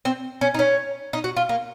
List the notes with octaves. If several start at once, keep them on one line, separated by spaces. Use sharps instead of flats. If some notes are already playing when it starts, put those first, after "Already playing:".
C4
C#4
D#4
C#4
D#4
F#4
F4
A#3